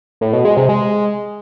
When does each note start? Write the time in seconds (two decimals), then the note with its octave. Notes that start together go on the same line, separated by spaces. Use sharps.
0.21 A2
0.33 B2
0.45 G#3
0.57 C3
0.69 G#3